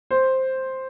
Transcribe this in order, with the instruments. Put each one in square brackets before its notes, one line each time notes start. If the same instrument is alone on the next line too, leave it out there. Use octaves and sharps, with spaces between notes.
[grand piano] C5